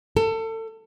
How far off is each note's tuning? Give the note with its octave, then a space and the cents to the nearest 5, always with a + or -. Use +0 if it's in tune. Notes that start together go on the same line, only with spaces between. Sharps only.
A4 +30